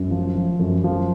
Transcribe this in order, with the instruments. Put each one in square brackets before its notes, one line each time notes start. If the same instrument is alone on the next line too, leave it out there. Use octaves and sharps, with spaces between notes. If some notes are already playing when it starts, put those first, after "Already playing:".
Already playing: [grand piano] F#2
F3
F3
F#2
F3